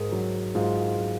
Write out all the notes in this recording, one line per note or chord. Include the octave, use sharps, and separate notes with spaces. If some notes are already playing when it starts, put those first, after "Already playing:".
Already playing: G#2 G#4 A#4
F#3
G#2 F4
F#3